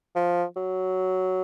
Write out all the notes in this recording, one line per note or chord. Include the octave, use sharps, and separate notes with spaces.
F3
F#3